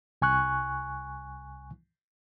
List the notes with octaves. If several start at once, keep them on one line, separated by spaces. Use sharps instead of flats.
C2 G#5 C#6 F#6